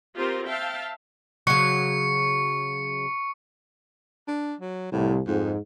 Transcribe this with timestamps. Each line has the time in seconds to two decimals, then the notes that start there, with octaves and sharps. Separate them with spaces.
0.15 C4 F4 G4 A#4 C5
0.47 E5 F5 G5 A5
1.47 C#3 F#3 C#6 C#7
4.28 D4
4.61 F#3
4.92 C2 A2
5.27 F2 G#2